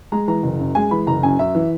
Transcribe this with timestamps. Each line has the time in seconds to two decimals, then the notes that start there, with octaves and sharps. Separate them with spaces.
0.12 G#3 A#5
0.28 E3 A#5
0.43 F#1
0.59 F#2
0.75 G#3 G#5
0.91 E3 B5
1.07 F#1 A#5
1.23 F#2 G#5
1.39 F#2 E5
1.55 E3